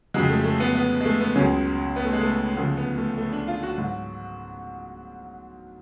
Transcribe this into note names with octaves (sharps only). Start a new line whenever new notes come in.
F2 C#3 F#3 G#3
A3
A3
B3
B3
G#3
A3
B3
C#2 C#3 F#3 C#4
B3
A3
G#3
A3
D2 C#3 F3 A3
B3
A3
A3
D4
F4
F#4
G#2 F#3